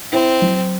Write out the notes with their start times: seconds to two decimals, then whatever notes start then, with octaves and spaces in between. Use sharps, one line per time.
0.12 C4 E4
0.42 F#3